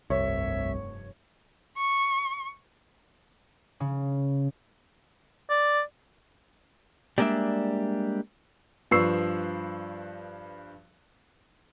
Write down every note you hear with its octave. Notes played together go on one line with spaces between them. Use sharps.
F1 C2 G2 C#5 E5
C#6
C#3
D5
G3 G#3 A#3 C#4 D4 E5
G2 F3 B4 C#6 E6 C7